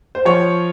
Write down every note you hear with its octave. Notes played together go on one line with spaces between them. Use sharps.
C5
F3 C#5